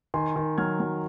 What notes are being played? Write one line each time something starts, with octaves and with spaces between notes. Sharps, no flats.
D#3 G#5 C6
D#3
F#3 F6 G#6
F#3